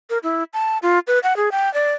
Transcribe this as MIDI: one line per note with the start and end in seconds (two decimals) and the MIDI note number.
0.10 0.18 70
0.23 0.44 64
0.54 0.78 81
0.82 0.99 65
1.07 1.19 71
1.23 1.36 78
1.37 1.49 68
1.52 1.72 79
1.74 1.93 74